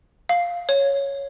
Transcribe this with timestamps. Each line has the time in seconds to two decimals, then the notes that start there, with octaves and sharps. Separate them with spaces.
0.29 F5
0.69 C#5